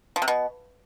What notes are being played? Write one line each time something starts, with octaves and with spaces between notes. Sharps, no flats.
F3
C3
B2